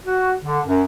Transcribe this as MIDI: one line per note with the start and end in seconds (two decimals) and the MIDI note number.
0.06 0.32 66
0.44 0.60 50
0.66 0.83 42